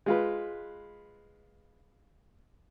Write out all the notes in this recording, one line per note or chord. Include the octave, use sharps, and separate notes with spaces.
G#3 F4 B4